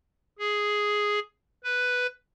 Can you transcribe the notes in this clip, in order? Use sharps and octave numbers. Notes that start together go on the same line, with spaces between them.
G#4
B4